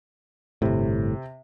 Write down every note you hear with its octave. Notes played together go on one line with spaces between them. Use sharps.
G1 A2 C3